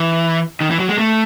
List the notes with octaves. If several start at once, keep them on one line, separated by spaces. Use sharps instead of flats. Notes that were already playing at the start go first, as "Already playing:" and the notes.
Already playing: E3
D#3
E3
F#3
G#3
A3